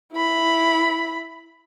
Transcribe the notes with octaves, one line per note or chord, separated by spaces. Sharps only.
E4 B5